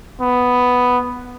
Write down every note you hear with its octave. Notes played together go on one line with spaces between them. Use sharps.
B3